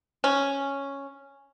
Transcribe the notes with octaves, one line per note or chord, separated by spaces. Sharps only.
C#4